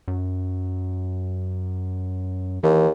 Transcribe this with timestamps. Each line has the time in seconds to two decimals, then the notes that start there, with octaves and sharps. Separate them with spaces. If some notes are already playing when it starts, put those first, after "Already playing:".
0.08 F#2
2.63 D#2 E3